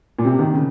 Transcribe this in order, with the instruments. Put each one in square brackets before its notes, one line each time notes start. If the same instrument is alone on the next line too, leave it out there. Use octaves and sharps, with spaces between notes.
[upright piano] A#2
C3
D#3
C#3